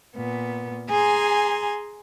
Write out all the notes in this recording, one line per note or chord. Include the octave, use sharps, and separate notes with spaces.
A#2 B3
G#4 G#5 A#5 C6